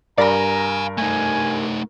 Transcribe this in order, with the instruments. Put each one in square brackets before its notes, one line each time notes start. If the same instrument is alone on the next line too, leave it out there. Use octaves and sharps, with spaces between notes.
[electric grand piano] G2 A#4 [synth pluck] D5 B5 A#6 [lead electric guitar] F5 G#5 [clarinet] A#5
[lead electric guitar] A3 D#4 [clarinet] G#5